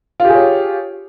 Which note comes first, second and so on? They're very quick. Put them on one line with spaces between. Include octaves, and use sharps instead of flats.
F4 G4 G#4 C#5